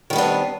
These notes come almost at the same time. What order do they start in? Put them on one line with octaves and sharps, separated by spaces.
D#3 G3 B3 D4 C4